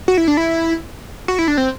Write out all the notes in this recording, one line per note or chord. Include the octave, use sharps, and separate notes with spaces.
F#4
E4
D4
E4
F#4
E4
D4
C4